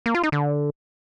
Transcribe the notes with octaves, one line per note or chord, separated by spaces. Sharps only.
A#3
F4
D#4
D3